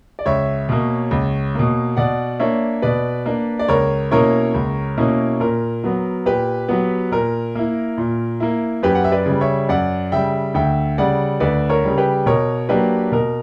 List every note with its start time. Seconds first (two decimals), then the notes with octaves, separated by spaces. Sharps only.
0.19 D5
0.26 C#2 C#5 E5
0.69 B2 A#3
1.11 C#2
1.55 B2 A#3
1.97 B2 D5 F#5
2.39 A#3 D4 C#5 E5
2.82 B2 B4 D5
3.26 A#3 D4
3.59 D5
3.68 C#2 A#4 C#5
4.11 B2 A#3 C#4 E4 A#4 C#5
4.54 C#2
4.98 B2 A#3 C#4 E4
5.40 A#2 A#4
5.84 F#3 B3
6.25 A#2 G4 B4
6.68 F#3 B3
7.11 A#2 A#4
7.55 A#3 E4
7.98 A#2
8.40 A#3 E4
8.83 F#2 G4 B4
8.95 F#5
9.04 E5
9.12 B4 D5
9.26 C#3
9.31 G3
9.41 C#5 E5
9.69 F#2 D5 F#5
10.12 C#3 G3 E5 G5
10.54 D2 E5 G5
10.98 C#3 G3 D5 F#5
11.40 D2 B4 D5
11.69 A#4 C#5
11.84 C#3 G3
11.98 G4 B4
12.26 B2 A#4 C#5
12.69 F#3 A#3 D4 G4 B4
13.12 B2 A#4